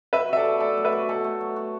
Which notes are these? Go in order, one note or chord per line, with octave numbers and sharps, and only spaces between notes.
F#3 B4 E5
F#4 E5
A4 D5
B2
A3 A4 D5
F#3
B4 E5
F#4
B2 A4
A3
F#3
F#4